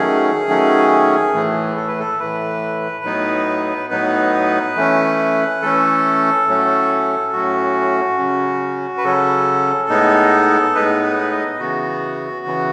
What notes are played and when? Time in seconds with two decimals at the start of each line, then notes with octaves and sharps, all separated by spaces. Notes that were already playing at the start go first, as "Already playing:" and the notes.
Already playing: D#3 F#3 A3 C#4 G#4
0.48 D#3 F#3 A3 C#4
1.34 A2 E3 A3
1.76 A4
1.88 B4
1.99 A4
2.19 A2 E3 A3 B4
3.04 A2 F#3 B3 D#4
3.90 A2 F#3 B3 D#4 B4
4.75 E3 A3 C#4
5.62 E3 A3 C#4 A4
6.47 A2 F#3 A3 C#4
7.32 A2 F#3 A3 C#4 F#4
8.18 C#3 F#3 C#4
8.97 B4
9.03 C#3 F#3 C#4 A4
9.89 A2 G#3 B3 D#4
10.75 A2 G#3 B3 D#4 B4
11.03 B4
11.31 D#5
11.60 C#3 E3 B3 F#4
12.46 C#3 E3 B3